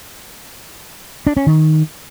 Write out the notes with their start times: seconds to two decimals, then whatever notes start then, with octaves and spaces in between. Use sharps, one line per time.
1.27 D4
1.37 C#4
1.47 D#3